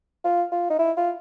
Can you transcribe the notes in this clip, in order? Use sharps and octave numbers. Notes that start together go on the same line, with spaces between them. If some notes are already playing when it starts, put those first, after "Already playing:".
F4
F4
D#4
E4
F4